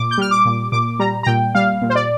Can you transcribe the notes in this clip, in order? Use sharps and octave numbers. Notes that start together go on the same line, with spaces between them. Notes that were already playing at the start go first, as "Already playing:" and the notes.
Already playing: A#2 D6
G6
G3 F6
D6
A#2
A#2 D6
G3 A#5
A#5
A#2 G5
G3 F5
A#2
C5
D5